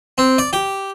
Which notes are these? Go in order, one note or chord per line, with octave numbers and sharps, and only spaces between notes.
C4
D5
G4